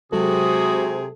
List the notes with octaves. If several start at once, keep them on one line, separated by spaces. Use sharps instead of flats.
C3 F#3 G#3 F#4 G#4 A4 D#6